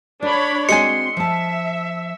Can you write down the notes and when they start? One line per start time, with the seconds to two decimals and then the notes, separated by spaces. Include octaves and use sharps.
0.22 D4 C#5 D5 B5
0.69 G#3 C4 F#4 G#5 C6 C#7
1.17 F3 E5 A5